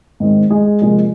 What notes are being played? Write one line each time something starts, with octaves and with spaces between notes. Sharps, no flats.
G#2 D#3 G#3 C4
G#3 G#4
C3 F3 G#3 A#3 G#4